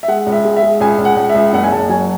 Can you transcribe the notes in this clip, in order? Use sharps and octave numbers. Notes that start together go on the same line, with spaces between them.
E5
G#3 F#5
C#2
E5
G#3
E5
G#3
C#2 G#5
C#2
F#5
C#2
E5
C#2
F#1 F#5
G#5
F#1 A5
F#3 G#5